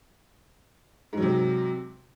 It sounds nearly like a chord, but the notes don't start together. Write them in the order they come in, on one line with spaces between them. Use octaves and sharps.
G#2 F#3 C3